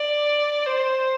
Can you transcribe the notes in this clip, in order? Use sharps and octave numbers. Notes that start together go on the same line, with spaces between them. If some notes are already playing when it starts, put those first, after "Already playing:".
Already playing: D5
C5